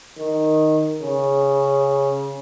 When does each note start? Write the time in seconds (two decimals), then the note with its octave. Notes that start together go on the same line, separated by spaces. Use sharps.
0.18 D#3
1.02 C#3